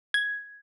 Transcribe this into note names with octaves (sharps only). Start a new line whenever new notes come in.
G#6